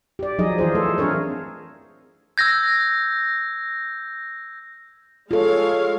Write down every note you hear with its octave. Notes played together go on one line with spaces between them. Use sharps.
G4 D5
F3 F#3 D#4 G#4 D#5
E3 F4 G#4 C5
A3 A4
C4 D4 G#4 A#4 C#5
E6 G6 G#6 A#6
G#3 F4 A4 C#5 F5